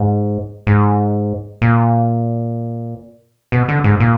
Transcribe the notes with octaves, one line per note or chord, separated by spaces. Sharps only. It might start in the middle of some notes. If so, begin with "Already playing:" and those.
Already playing: G#2
G#2
A#2
B2
D3
G#2
A#2